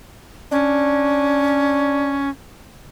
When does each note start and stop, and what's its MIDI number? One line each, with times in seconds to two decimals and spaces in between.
0.52 2.29 61
0.52 2.18 62